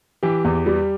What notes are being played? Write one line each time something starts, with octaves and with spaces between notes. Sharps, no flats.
E3 G4
E2
G3